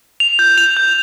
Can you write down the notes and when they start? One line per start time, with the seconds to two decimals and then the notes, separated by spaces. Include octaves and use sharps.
0.20 F7
0.39 G6
0.58 F7
0.77 G6